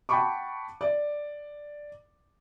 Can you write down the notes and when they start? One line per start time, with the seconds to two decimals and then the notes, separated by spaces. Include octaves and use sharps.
0.09 F#5 G5 A5 B5 C#6 D6
0.81 D5